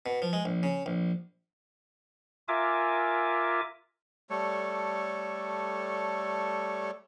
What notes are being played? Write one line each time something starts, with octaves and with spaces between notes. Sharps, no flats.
B2
F3
G#3
A#1
C#3
A#1
F4 A#4 E5 G#5 D6
G3 A3 A4 C#5